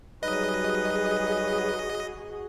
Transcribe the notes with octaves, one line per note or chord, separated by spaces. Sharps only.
F#3 G3 D#4 F#4 G#4 B4 D#5